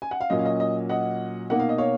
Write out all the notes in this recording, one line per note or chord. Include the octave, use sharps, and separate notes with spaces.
G#5
F#5
F5
A#2 F#3 C#4 D#5
F5
D#5
D#5
D#5 F#5
B2 A#3 D#4 F#5
F5
D#5
C#5 F5